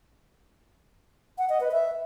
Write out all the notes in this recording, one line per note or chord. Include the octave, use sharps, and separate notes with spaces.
F#5
D#5
B4
E5